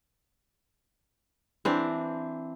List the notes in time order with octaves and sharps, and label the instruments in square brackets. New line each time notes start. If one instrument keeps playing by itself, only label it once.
[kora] E3 C4 D4